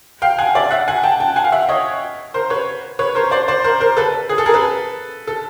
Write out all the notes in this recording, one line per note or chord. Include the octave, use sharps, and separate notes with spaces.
F5 G5
F#5 G#5
D5 E5
E5 F#5
F#5 G#5
G5 A5
G5 A5
F#5 G#5
F5 G5
E5 F#5
C#5 D#5
A#4 C5
B4 C#5
B4 C#5
A#4 C5
C5 D5
C5 D5
A#4 C5
A#4 C5
A4 B4
G#4
A4
G#4 A#4
A4 B4
A4